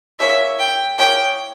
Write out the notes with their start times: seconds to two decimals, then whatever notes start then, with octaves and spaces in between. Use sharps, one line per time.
0.20 A#3 C#4 E4 G#4 E5
0.59 G5
0.98 A#3 C#4 E4 G#4 G5